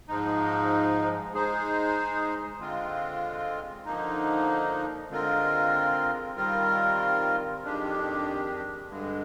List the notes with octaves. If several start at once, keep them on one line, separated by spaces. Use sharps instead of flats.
G#2 F3 G#3 D#4
G#3 D#4 G#4 C5
D3 G#3 C4 F4
D3 F3 A#3 D#4
D3 G#3 C4 F4 A#4
D#3 G3 C4 F4 A#4
F2 D#3 G#3 D4 G4
G2 D3 G#3